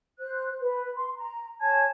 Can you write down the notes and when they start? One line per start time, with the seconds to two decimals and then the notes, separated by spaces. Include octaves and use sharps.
0.20 C5 F#6
0.61 B4
0.96 C6
1.16 A#5
1.62 C#5 G#5 A5 G#6